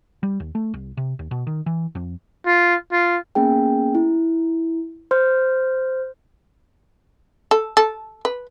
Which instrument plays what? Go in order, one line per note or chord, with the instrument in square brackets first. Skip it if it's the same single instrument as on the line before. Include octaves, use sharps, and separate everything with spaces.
[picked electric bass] G3
D#2
A3
C2
C3
D#2
B2
D#3
E3
F2
[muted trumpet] F4
F4
[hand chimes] A#3 B3 C#4 G#4 G5
E4
C5 C6 F6 G6
[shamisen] A4
A4
B4